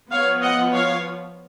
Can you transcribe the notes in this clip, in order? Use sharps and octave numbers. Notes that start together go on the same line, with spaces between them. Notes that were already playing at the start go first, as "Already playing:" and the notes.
F3 B3 C#5 F5
D#5 F#5
C#5 F5